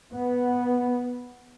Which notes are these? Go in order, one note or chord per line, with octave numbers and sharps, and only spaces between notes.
B3